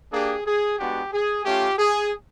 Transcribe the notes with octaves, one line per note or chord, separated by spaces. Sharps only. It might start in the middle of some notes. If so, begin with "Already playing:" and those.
A#3 D4 G4 G#4
G#4
G#3 B3 D4 F#4 G4
G#4
A3 C#4 F4 G4
G#4